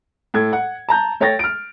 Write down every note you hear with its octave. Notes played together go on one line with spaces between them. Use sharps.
A2 A4 G#6
F#5
A5 A#5 G6
A3 C#5 G5 A6 A#6
F6 D7